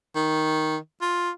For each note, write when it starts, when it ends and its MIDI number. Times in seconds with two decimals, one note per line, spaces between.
0.15 0.77 51
1.01 1.30 65